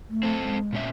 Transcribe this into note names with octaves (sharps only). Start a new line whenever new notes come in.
A3
C4 A4
G#3
A#2 C#4 E5